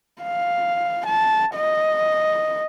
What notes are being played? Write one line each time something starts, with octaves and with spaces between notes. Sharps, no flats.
F5
A5
D#5